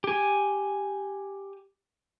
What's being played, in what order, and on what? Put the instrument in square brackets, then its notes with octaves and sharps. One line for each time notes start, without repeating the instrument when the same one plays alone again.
[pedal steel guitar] G4 G#5